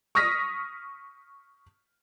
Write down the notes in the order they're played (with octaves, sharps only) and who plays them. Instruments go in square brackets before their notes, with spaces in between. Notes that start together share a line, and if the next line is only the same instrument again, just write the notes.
[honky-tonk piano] C#6 D#6 F6 A#6 B6